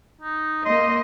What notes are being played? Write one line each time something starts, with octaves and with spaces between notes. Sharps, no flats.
D#4
A#3 D#5 C6